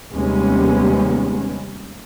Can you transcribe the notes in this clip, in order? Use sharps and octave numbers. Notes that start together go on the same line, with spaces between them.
D#2 C3 G3 G#3 B3 C#4